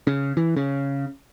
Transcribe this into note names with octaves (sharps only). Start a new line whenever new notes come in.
C#3
E3
C#3